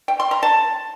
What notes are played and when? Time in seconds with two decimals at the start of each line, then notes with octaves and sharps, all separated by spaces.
0.08 G5
0.20 C6
0.31 A#5
0.43 A5